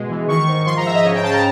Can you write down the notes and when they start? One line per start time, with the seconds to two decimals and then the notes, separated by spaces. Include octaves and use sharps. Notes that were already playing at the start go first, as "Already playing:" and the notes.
Already playing: B2 G#3
0.10 E3
0.28 D#3 C#6
0.48 G#2
0.66 F3 C6
0.77 A#5
0.86 G#2 E5
0.95 D#5
1.05 C#3 C#5
1.15 G5
1.23 C#3 A5
1.33 A#5